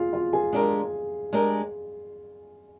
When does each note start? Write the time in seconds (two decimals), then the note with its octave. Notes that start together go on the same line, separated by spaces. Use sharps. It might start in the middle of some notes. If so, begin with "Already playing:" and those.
Already playing: F4 G#4 F5
0.13 F4 F5
0.33 G#4 G#5
0.53 G#3 D4 G4 A#4
1.33 G#3 D4 G4 A#4